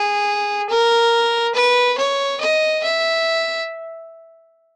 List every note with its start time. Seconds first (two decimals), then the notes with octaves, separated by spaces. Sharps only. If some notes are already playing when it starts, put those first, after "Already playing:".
Already playing: G#4
0.70 A#4
1.55 B4
1.98 C#5
2.41 D#5
2.84 E5